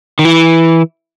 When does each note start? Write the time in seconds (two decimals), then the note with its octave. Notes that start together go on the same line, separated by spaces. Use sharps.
0.19 D#3
0.25 E3